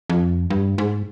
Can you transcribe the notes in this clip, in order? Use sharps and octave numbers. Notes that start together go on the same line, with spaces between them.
F2
G2
G#2